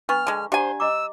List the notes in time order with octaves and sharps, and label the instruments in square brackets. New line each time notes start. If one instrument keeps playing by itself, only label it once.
[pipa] B3 [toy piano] D4 C#6 [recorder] F6
[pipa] D3 G#3
[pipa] D4 G#5 [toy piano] G4 F#5 A#5 [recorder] C5
[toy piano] D#5 A#5 D6 [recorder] E6